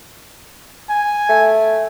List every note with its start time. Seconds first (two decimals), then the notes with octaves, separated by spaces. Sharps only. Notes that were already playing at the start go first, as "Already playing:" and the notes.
0.89 G#5
1.29 A3